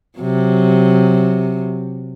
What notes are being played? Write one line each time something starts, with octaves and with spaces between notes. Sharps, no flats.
C3 F#3